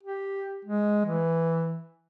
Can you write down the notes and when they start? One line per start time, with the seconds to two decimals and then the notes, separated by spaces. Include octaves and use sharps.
0.03 G4
0.65 G#3
1.05 E3